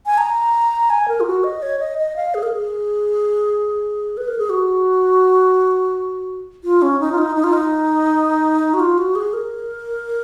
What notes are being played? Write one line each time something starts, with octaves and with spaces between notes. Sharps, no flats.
G#5
A#5
G#5
A#4
F4
F#4
D#5
C#5
D#5
D#5
F5
G#4
A#4
G#4
B4
A#4
G#4
F#4
F4
C#4
D#4
F4
D#4
D#4
F4
D#4
F#4
F4
F#4
G#4
A#4